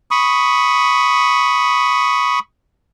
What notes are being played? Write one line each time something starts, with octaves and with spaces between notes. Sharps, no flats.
B5 C#6 D#6